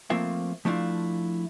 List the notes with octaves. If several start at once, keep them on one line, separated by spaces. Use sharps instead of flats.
F3 A3 A#3 C4 F4 E5
F3 A3 D4 E4 F4